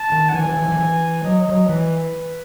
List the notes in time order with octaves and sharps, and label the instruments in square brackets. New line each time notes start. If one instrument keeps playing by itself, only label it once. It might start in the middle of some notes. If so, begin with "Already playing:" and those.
Already playing: [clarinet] A5
[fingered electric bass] D#3
[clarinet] F#5
[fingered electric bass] E3 [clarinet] G#5
[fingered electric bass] E3
E3
E3
E3
[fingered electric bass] F#3 [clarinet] D#5
[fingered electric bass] F#3
[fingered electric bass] E3 [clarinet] B4